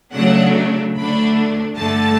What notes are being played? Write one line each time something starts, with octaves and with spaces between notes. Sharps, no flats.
C#3 F#3 A3 D4 F#5
D2 D3 A3 D4 B5
G2 D3 A3 A5